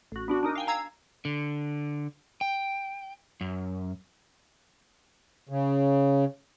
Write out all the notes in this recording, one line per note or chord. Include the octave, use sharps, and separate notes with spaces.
A1 F#4
B3 D4 F#4
D4 D#4 A#4
F5 G5 G#5
F5 A#5 E6 G#6 C7
D3
G5
F#2
C#3